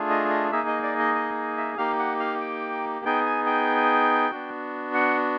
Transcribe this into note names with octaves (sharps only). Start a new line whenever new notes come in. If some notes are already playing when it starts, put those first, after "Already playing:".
Already playing: A3 D4 F4 G#4
D#5
D#5
A#3 D#4 G#4 E5
D#5
D5
D#5
D#5
E5
A#3 D#4 G4 F5
F#5
F5
G5
B3 D#4 G#4 G5
G#5
G5
B3 D4 F#4
F#5